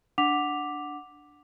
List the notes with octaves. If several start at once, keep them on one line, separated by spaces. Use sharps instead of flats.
D4 F#5 D6 B6 F7